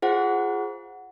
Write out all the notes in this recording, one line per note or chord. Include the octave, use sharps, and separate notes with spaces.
F4 G#4 C5 F#5